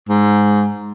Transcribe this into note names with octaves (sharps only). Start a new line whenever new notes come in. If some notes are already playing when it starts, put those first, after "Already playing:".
G#2